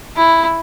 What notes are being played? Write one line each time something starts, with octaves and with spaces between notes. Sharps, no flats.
E4